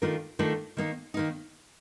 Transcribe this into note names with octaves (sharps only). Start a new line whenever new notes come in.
D#3 A3 D4 F4 A#4
D#3 A3 D4 F4 A#4
D#3 A#3 D#4
D#3 A#3 D#4